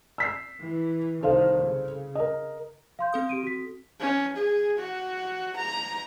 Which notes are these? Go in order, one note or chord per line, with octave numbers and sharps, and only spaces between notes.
E6 B6 C7
E3
C2 D#3 A4 C5 F5
C#3
A#4 D#5
F5 C6 G6
C4 A4 D#6
G4 D7 D#7
F#4 B6
C#4
G#4
F#4
A#5